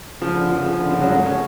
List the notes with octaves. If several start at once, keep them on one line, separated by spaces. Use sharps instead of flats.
C#3 F3
D3
C#3 F3
C#3 F3
D3
C#3 F3
D3 F#3
F#3 A3
A3 C#4